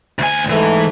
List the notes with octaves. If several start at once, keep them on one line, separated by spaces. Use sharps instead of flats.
D2 G#5
G#2 E3 A3